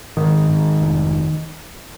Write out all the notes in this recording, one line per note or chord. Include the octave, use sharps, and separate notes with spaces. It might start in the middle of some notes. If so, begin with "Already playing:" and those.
G#2 D#3
G#2
F1